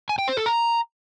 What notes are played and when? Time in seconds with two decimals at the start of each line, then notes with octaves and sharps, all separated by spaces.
0.09 G#5
0.19 G5
0.28 C5
0.37 A4
0.46 A#5